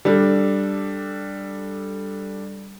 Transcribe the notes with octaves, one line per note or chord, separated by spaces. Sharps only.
G3 D4 A4